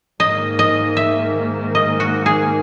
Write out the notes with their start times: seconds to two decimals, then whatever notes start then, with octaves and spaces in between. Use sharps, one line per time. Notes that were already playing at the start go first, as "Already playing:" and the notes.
0.20 G#2 D#3 A#3 D#5
0.59 D#5
0.97 E5
1.75 D#5
2.00 F#4
2.26 G#4